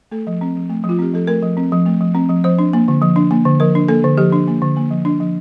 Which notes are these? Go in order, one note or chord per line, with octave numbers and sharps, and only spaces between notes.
A3 A4
F3
C4
F3
A3
F3
F4
C4 G4
F3 A4
A3 A#4
F3
C4
F3
A3
F3
C4
F3
F3 C5
D4
A#3
D3
F3
D4
A#3
D3
F3 A#4
D4
A#3 A4
D3
F3 G4
D4
A#3
D3
A#3
F3
D4
F3